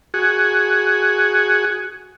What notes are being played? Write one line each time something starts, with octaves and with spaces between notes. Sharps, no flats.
F#4 G#4